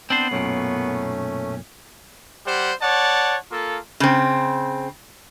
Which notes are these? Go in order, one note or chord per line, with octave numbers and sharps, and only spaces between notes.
B3 C4 D4 C5 C7 F#7
B1 F#2 A#2 A3 C#4
G3 G4 C5 F#5
C#5 D5 F#5 A5
A#3 F4 A4
C#3 C4